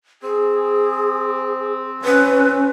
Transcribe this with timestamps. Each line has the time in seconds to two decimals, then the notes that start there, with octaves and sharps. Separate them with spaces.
0.22 C4 G#4
2.04 C#4 B4